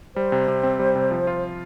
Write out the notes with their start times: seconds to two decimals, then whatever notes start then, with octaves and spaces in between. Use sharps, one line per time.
0.16 G3 C5
0.32 C3
0.48 C3
0.63 C4
0.79 G3
0.96 C3
1.11 F3
1.27 F4